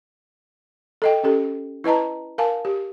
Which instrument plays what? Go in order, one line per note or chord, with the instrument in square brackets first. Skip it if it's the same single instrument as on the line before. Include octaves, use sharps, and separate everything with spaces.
[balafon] A4 D#5 G5
C#4 G4 A4
E4 B4 D#5 A5 A#5
A#4 F5 G#5 A5
G4